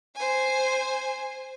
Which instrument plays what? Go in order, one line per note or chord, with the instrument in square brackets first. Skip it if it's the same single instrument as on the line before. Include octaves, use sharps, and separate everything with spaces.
[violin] C5 G#5